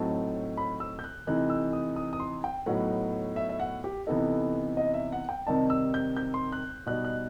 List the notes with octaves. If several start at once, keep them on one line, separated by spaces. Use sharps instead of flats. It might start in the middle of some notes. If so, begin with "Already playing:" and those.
Already playing: A2 F#3 C4 D#4 A5
B5
E6
G6
F#6
C3 E3 A3 D#4 F#6
E6
D#6
D#6
D#6
C6
G5
A2 F#3 B3 D#4 F#5
E5
E5
F#5
G4
C3 E3 B3 D#4 A4
D#5
E5
F#5
G5
C3 D#3 G3 C4 D#4 A5
E6
G6
G6
C6
F#6
B2 G3 D#4 F#6
F#6